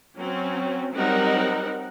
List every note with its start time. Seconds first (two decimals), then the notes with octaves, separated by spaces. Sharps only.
0.17 F#3 C4 C#4
0.93 F#3 G3 C4 D#4 A#4 F#5